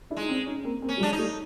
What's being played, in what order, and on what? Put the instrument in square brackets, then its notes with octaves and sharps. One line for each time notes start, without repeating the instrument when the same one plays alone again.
[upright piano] D4 E4
[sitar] G#3 [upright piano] D#4
[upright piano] C4 D4
C#4 D#4
A#3 C4
A#3 C4
[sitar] C#4
[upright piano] G3
F#3 G#3
[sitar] D4
D#4
[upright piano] G3 A3